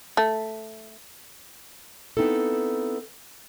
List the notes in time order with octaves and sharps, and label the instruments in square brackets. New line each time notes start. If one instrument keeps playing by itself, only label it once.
[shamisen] A3
[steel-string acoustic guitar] B3 C4 D#4 E4 A4